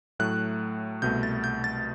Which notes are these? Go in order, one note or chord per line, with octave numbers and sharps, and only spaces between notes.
A2 F#3 A3 F#6
C2 B2 A3 G6
A6
G6
A6